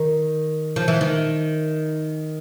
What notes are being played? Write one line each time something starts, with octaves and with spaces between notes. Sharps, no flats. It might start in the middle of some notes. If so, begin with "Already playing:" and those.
Already playing: D#3
F3
E3
D#3